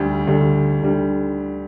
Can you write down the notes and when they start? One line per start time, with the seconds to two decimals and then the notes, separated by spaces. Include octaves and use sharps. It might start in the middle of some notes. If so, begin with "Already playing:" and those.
Already playing: D2 D3 G3
0.27 D2 D3 G3
0.82 D2 D3 G3